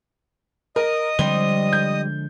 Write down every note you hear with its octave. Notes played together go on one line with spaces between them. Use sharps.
A#4 D#5 D#6
D3 F3 G3 G#3 C4 G7
G6